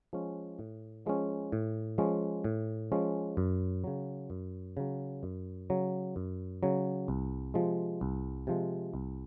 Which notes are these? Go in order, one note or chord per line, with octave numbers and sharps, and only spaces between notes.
F3 G#3 C#4
A2
F3 G#3 C#4
A2
F3 G#3 C#4
A2
F3 G#3 C#4
F#2
C#3 F#3
F#2
C#3 F#3
F#2
C#3 F#3
F#2
C#3 F#3
C2
C3 F3 G#3
C2
C3 F3 G#3
C2